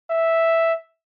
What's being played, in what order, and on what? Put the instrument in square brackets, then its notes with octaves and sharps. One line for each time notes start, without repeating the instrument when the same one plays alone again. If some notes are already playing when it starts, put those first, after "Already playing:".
[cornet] E5